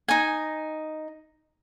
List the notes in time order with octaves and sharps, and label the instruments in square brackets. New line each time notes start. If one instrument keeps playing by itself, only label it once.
[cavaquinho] D#4 G#5